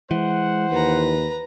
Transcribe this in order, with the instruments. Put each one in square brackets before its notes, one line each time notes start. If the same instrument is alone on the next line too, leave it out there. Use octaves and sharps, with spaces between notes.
[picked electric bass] E3 [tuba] G#3 [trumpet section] C5 F#5
[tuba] D#2 [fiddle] B4 A#5